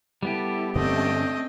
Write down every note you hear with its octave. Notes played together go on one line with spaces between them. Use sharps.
G3 B3 E4 G4 A4
G2 D3 A3 C4 C#4 D#5